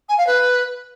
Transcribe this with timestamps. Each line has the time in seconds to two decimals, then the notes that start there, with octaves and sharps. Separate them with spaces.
0.09 G#5
0.18 F5
0.27 B4